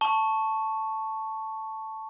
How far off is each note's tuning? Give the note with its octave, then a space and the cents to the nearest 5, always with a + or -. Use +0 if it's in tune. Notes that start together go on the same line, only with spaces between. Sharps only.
A5 +0 C#6 +0